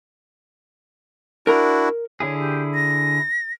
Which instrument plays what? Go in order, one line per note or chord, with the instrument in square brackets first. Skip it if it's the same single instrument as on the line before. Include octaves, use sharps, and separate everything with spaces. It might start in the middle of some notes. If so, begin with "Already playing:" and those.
[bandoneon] D4 E4 F#4 [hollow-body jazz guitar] A#4 A#5
[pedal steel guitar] D3 E4 G#4 [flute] C#5
[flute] G4
A#6